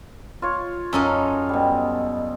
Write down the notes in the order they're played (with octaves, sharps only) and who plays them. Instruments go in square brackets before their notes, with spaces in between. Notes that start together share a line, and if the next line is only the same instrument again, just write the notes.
[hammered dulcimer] F4 C#5
[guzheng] F#2 C#4 D#4 [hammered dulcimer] A4 D#5 F5
[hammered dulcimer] B2 G3